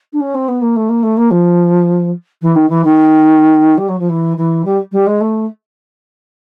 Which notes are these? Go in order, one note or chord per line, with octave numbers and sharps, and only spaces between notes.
D4
C#4
C4
B3
A#3
A3
A#3
A3
A#3
F3
E3
D#3
E3
D#3
G3
F#3
F3
E3
E3
G3
G3
G#3
A3